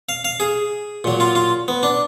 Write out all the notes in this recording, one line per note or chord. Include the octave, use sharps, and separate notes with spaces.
F5
F5
G#4
A#2 F#3
F4
F4
B3
D4